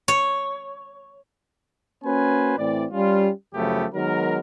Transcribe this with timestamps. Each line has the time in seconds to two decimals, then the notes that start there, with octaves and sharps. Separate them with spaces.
0.08 C#5
2.03 A#3 C#4 F#4 B4 C5 G#5
2.58 A2 E3 C4 D5
2.92 G3 C#4 F4
3.54 F#2 C#3 F3 A3 B3 G4
3.94 D#3 F#3 G#3 B3 A#4